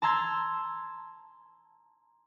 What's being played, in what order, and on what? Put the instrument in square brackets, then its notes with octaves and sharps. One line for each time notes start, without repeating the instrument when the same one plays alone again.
[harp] A5 A#5 C6 E6 G#6